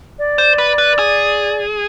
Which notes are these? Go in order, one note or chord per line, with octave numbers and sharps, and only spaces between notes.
D5
C5
B4
B4
G#4